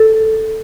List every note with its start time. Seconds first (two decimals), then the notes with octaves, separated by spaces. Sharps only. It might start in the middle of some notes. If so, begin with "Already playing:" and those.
Already playing: A4